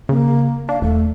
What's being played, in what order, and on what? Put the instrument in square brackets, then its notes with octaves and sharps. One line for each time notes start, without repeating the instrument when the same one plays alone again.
[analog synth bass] C#3 [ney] A#3
[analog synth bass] D4 [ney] F5
[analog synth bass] E1 [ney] A3